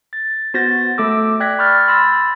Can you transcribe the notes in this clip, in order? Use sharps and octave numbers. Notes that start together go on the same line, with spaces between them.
A6
B3 F#4 C5 G6 A6 A#6
A3 A4 D6 E6
D5 G5 F#6 G#6 A#6 B6
B5 C#6 E6 F6 G6 A6
B5 C6 E6 A6 A#6